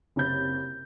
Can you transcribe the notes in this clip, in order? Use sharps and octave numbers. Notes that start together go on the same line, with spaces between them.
F#1 C3 C#5 B5 G6 A6